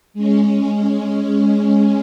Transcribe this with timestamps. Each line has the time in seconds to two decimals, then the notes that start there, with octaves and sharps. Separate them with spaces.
0.14 G#3 C#4